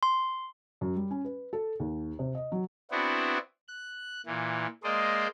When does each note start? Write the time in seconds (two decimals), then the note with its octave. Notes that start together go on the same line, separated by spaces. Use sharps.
0.03 C6
0.81 F#2
0.96 G3
1.11 C#4
1.25 B4
1.53 A4
1.80 D#2
2.19 C3
2.35 D#5
2.52 F#3
2.91 B3 C4 D4 E4 F#4
3.68 F#6
4.26 A#2 E3
4.84 G#3 A#3 C5 D5 D#5